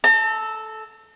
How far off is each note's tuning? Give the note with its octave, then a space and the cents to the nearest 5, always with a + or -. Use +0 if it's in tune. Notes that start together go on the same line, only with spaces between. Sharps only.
A4 -10 A#5 -45